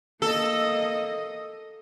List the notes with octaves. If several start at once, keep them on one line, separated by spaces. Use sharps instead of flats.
A#3 A4 D#5